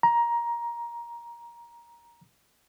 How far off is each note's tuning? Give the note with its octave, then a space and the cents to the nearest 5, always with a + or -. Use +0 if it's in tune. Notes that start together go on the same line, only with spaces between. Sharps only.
A#5 +15